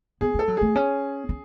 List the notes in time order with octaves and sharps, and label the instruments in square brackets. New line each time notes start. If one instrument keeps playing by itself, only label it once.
[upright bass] B3 [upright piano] G#4
[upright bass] A3 [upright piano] A4
[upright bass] F#3
[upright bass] A3 [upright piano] G#4
[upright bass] C#4
C#4